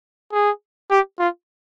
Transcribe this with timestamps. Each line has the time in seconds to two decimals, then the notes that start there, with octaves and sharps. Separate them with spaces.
0.33 G#4
0.91 G4
1.19 F4